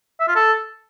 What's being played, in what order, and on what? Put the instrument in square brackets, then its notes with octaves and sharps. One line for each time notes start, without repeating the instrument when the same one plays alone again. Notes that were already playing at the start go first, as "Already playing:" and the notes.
[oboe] E5
F4
A4